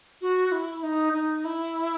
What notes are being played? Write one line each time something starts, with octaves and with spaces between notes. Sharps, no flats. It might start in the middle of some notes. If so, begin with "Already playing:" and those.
F#4
E4
D#4
D#4
E4